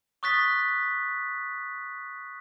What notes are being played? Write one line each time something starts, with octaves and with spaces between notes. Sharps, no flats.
C#6 D#6 F#6 A6 B6